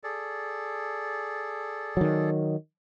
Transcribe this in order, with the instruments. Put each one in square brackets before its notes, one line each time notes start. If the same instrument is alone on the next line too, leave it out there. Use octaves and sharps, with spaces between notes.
[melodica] G#4 A4 D5
[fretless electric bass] D#3 F#3